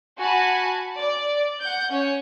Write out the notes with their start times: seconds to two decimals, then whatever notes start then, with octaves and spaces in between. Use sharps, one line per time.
0.19 F#4 G#5 A5 B5
0.98 D5
1.61 F#5 G6
1.91 C#4 C#5